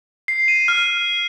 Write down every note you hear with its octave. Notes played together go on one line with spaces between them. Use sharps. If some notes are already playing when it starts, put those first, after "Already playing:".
C7
D#7
F6